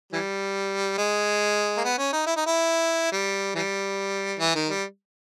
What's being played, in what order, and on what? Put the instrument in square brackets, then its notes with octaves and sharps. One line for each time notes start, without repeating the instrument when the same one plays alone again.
[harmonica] E3 G3
G#3
A#3
B3
C#4
D#4
E4
D#4
E4
G3
E3 G3
E3
D#3
G3